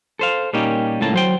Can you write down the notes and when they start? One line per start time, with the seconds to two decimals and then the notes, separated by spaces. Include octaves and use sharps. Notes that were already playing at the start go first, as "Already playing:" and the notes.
0.19 A4 C5 F5
0.53 A#2 G3 A#3 C#4 D#4 G4
1.01 C#2 A2 A#3 A5
1.14 F#3 C5 G5